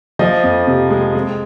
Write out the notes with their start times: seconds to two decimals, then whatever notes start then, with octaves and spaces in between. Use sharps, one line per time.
0.19 F3 D#5
0.43 F2
0.67 C3
0.90 G#3
1.15 G#3